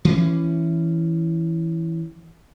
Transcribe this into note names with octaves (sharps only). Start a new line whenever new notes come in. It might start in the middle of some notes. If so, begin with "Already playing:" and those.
E3 C#4